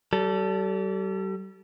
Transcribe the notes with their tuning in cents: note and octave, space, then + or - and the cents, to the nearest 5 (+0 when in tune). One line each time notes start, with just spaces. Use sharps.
G3 -35 A4 +0